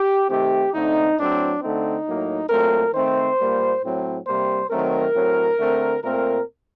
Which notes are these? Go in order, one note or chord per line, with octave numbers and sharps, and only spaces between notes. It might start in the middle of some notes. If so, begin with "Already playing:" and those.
Already playing: G4
D#3 A3 C4 G4
D3 A3 C4 D#4
A2 F#3 C4 D4
D3 A3 C4 D#4
A2 F#3 A#3
A#2 F#3 A3 C4 A#4
D#3 A3 C4 C5
A#2 G3 A#3
A2 F#3 C4
C3 G3 A#3 C5
D#3 F#3 A3 C4 A#4
A2 F#3 C4
D3 A3 C4
A#2 A3 C4 A#4